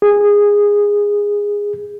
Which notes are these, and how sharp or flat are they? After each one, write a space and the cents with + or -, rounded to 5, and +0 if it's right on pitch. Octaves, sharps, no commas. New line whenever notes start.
G#4 -15